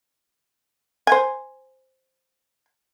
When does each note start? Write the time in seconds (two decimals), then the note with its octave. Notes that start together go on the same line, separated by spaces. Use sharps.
1.07 C5 G#5